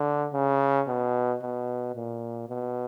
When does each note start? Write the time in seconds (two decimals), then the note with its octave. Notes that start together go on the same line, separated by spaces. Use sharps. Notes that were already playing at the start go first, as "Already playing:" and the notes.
Already playing: D3
0.33 C#3
0.87 B2
1.42 B2
1.95 A#2
2.49 B2